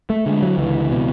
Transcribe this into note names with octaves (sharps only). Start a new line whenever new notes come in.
A3
D3 G#3
F#3
C#2 E3
B2